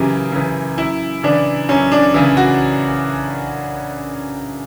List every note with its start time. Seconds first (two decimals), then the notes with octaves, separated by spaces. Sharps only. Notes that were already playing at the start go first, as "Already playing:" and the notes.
Already playing: F#2 C#3 E3 G4
0.32 C#3 E3
0.78 F#2 E4
1.23 C#3 E3 D4
1.69 F#2 C#4
1.92 D4
2.14 C#3 E3
2.37 F#4